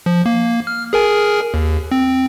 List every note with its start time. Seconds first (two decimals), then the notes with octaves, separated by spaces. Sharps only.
0.06 F3
0.26 A#3
0.67 F6
0.93 G#4 A#4 G#5
1.54 D#2
1.92 C4